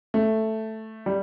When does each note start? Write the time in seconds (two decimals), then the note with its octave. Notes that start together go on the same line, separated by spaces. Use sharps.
0.14 A3
1.06 G3